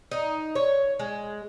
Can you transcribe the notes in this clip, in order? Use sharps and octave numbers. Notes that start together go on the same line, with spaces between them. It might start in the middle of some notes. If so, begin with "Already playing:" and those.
D#4
C#5
G#3